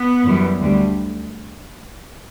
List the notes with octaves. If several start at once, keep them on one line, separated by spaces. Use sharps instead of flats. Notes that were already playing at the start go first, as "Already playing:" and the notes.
Already playing: B3
F#2 E3 G3
D2 D3 G3